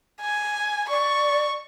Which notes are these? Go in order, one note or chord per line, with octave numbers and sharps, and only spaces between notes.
G#5
D5 C#6